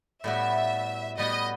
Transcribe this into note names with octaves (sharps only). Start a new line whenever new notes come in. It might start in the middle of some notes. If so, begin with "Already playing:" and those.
A2 G3 B3 F#4 E5
A2 G3 B3 F#4 D#5